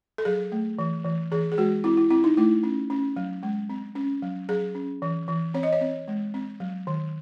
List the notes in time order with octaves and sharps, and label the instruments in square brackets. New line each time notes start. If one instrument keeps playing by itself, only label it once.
[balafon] A4
F#3 G#4
A3
E3
E3
E3 G#4
G#4
G#3 F#4
C4 E4
E4
C4 E4
D#4
A3 E4
C#4
C#4
F#3
G#3
C4
C#4
F#3
F#3 G#4
C#4
E3
E3
C4 C#5
D#5
C#5
C4
G#3
C4
F#3
D#3